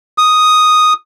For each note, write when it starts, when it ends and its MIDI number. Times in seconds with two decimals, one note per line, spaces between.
0.18 0.93 87